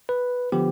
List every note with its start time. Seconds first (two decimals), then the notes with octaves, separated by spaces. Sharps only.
0.09 B4
0.52 D3 F3 B3 G4